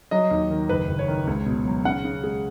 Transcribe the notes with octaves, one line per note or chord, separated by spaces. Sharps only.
F#3 D#5
D#2
D#3
F#1 B4
F#1
C#5
D#3
C#2
B2
F#3
C#3 F#5
C#3
G#3